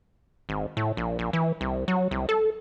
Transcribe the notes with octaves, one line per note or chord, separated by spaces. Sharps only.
G#1
A2
A#1
A#1
E3
C2
F#3
C2
A4